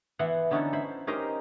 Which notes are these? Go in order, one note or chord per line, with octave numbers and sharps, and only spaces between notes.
E3 B3 E4 F#5 C6
D3 B3 C#4 D#4 E4 A4
E4 C5 B5
C#4 D#4 G4 A#4 C5 D#5